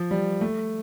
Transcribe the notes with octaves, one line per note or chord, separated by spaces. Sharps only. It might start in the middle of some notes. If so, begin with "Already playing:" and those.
Already playing: F3
G3
A3